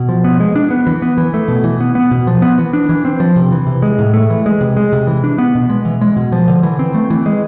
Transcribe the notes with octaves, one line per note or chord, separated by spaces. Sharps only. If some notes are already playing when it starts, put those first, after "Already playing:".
Already playing: B2
F3
B3
G#3
D4
B3
E3
B3
E3
A3
B2
E3
B3
B3
B2
F3
B3
E3
D4
E3
C4
F3
C3
E3
C3
G#3
A2
A3
E3
G#3
C3
G#3
C3
E3
D4
B3
B2
G#3
E3
G#3
B2
F3
D3
E3
C4
A3
E3
G#3